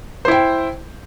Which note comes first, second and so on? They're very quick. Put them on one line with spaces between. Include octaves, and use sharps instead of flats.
C5 E4 G5